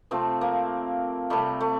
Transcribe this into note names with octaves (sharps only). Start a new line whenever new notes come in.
C3 F3 A3 C4
A#3
C3 G3 A3
A3